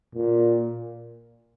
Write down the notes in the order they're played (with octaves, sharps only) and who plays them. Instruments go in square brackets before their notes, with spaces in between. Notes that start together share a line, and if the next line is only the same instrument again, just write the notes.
[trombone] A#2